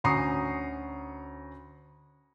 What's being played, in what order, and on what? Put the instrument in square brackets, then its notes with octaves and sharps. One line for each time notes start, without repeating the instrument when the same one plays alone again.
[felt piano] D2 C#4 A#5 C#6 D#6 C7